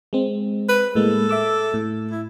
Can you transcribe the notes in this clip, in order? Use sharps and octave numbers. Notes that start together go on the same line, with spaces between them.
G#3 C4
B4
A2 G#3 A#3 A4
E5 D6 E6
A2
E4